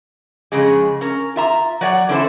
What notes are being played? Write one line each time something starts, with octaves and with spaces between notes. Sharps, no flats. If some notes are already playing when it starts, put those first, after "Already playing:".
F2 C#3 G#3
C#4 A#4
F4 E5 A#5
F#3 C#5 D5 F#5
E2 D3 C#4 E4 A4 C5